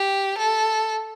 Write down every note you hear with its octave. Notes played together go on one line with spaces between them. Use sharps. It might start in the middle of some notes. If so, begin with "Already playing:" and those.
Already playing: G4
A4